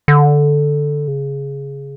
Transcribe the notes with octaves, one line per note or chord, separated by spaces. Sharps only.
D3
C#3